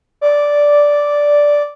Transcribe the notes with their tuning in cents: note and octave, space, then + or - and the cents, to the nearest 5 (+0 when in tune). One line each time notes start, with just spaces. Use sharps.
D5 -5